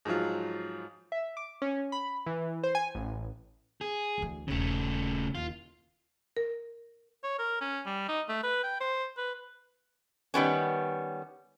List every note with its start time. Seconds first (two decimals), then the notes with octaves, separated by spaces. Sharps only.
0.05 G#2 F3 F#3 F4
1.12 E5
1.37 D6
1.62 C#4
1.92 B5
2.26 E3
2.63 C5
2.75 G#5
2.95 A1
3.81 G#4
4.18 D2 E3
4.48 D#1 C#3 A3 D#4
5.35 D#2 F4
6.37 A#4
7.24 C#5
7.39 A#4
7.61 C#4
7.86 G3
8.08 D#4
8.28 A3
8.43 B4
8.63 G5
8.80 C5
9.17 B4
10.34 D#3 G3 B3 C#4